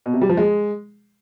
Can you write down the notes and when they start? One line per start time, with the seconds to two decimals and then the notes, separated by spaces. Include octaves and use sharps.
0.06 B2
0.14 C3
0.21 G3
0.29 F3
0.37 G#3